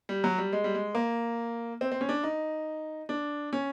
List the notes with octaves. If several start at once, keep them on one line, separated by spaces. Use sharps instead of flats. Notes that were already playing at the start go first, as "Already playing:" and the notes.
G3
F#3
G3
G#3
G3
G#3
A#3
C4
C4
C#4
D4
D#4
D4
C#4